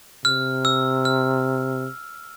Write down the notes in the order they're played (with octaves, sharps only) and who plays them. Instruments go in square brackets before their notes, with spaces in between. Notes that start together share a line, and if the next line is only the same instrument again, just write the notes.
[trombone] C3 [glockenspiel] F6
[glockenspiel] E6
F6